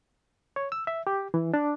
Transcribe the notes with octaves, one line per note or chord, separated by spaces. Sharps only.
C#5
E6
E5
G4
E3
D4